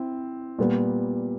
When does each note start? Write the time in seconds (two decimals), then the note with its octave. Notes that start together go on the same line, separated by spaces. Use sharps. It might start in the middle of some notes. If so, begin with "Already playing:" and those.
Already playing: C4 E4
0.59 A#2 G3 B3